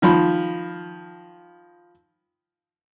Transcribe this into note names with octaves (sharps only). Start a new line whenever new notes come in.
D#3 F3 B5